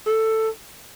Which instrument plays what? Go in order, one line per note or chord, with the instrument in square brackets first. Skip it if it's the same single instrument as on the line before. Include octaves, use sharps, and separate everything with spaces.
[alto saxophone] A4